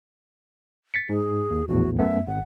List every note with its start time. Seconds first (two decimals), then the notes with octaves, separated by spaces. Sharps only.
0.94 A6 B6 C#7
1.09 G#2 G#4
1.50 D#2
1.68 A#1 E2 A2 F#4
1.99 F#2 A3 B3 E5
2.27 G#1 F#5